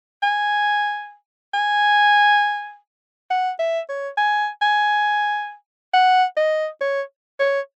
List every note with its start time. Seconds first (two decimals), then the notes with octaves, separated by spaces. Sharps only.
0.22 G#5
1.54 G#5
3.30 F#5
3.59 E5
3.89 C#5
4.17 G#5
4.62 G#5
5.93 F#5
6.37 D#5
6.81 C#5
7.40 C#5